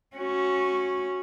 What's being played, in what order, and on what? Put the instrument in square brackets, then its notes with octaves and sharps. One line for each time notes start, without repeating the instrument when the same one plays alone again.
[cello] C#4 F#4